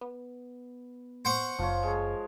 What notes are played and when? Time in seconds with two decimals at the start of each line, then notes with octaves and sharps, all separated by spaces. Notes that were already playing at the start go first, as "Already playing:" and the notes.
0.01 B3
1.25 C5 F#5 C#6
1.59 F#1 F3 F4 C#5
1.83 G#3 C#5